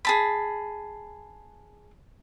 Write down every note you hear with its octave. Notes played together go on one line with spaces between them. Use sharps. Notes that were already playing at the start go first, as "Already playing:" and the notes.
G#4 A5 B5